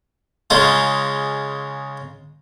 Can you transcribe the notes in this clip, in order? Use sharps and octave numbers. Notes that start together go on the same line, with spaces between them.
C#3 G#3 D#4 F4